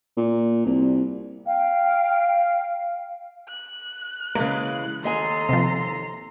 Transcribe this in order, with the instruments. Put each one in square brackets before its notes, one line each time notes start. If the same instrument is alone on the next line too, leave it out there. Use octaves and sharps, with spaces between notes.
[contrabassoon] A#2
C2
[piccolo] F5 [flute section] G5
[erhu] F#6
[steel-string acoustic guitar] C#3 E3 G#3 [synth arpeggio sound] A#3
[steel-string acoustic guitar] D#2 D#5 G#5 [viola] A4 C6 [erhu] A#5
[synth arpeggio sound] C3 F3